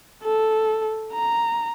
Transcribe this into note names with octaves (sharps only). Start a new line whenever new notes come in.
A4
A#5